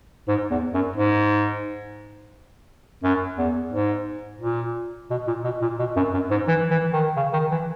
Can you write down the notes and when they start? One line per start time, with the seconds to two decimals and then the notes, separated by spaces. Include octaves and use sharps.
0.28 G#2
0.50 E2
0.74 F#2
0.96 G#2
3.04 F#2
3.38 E2
3.72 G#2
4.41 A#2
5.10 B2
5.27 A#2
5.44 B2
5.62 A#2
5.79 B2
5.96 F#2
6.13 F#2
6.31 G#2
6.48 E3
6.70 E3
6.93 D#3
7.16 C#3
7.33 D#3
7.51 E3